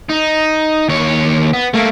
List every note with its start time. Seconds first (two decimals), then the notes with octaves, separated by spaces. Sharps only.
0.09 D#4
0.89 D#2 C#5
1.53 B3
1.74 A3 A#3